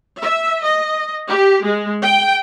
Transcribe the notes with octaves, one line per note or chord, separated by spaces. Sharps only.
E5
D#5
G4
G#3
G5